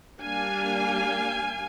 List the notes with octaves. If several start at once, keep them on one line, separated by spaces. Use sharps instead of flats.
G3 A#3 D4 F5 G#5